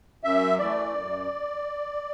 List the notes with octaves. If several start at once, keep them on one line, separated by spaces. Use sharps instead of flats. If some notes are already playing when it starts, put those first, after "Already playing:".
F#2 E5
E3 A3 D5
F#2